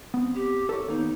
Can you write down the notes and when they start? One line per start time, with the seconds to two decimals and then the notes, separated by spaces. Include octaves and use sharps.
0.14 B3 C4
0.35 G4
0.69 A4 A#4 C#5
0.88 D#2 A#3 B3 D#4